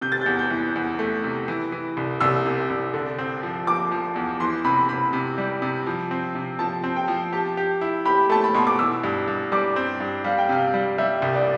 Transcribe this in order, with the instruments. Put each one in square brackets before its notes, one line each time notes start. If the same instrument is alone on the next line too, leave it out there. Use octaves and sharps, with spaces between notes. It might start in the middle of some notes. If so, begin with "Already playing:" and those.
[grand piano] C3 [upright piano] G6
[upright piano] A6
[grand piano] E2 [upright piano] G6
[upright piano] G6
[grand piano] E3
E2
A3
C3
E3
E3
C2
[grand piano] C2 [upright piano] E6
[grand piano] C3
C2
D3
C4
F3
[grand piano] F3 [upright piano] D6
[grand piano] F3
E2
[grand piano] E3 [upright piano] C6
[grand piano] C3 [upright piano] B5
[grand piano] C3 [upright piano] B5
[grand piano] C3
G3
C3
F3
C4
C3
[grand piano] F3 [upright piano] A5
[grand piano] C4
[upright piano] G5
[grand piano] F3
[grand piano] G4 [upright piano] A5
[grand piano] G4
E4
[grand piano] G4 [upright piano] B5
[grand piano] A3 [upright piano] A5
[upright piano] B5
[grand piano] B2 [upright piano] C6
[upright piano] D6
[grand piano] E3 [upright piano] E6
[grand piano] G2
G2
[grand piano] G3 [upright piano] D6
[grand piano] C4
G2
[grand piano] G3 [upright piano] F5
[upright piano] G5
[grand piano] C3 [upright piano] F5
[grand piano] G3
[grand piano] G3 [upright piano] E5
[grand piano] C2
[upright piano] D5